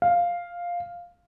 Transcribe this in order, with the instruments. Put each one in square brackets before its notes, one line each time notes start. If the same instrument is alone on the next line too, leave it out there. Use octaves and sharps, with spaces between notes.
[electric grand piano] F5